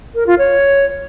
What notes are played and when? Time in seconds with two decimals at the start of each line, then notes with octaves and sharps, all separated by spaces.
0.15 A#4
0.27 F4
0.38 C#5